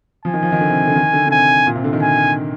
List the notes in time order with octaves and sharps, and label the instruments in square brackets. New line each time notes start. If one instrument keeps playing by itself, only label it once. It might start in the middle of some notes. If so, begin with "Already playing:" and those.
[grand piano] F3 [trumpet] G#5
[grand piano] D#3
F3
D#3
D3
C3
D3
D#3
D3
D3
[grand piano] C3 [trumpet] G#5
[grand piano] A#2
C3
D3
D#3
[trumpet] G#5